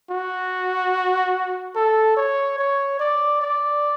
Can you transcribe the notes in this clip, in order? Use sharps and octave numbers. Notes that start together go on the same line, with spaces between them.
F#4
A4
C#5
C#5
D5
D5